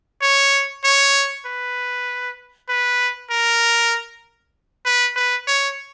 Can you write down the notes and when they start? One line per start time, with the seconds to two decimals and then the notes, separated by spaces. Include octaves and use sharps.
0.22 C#5
0.84 C#5
1.46 B4
2.69 B4
3.31 A#4
4.86 B4
5.16 B4
5.47 C#5